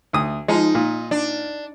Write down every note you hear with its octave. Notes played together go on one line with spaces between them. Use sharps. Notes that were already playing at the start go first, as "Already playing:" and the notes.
D2 D#6
F3 G#3 D#4
A#2
D4